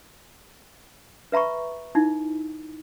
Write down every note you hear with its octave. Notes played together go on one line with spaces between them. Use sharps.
B4 E5 A#5 B5 C#6
D#4 E4